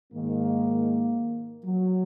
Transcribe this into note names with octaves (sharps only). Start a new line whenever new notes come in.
G#2 D#3 A#3
F#3